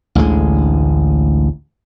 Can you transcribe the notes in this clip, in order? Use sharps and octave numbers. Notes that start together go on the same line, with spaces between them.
A1 D2 D3 G#3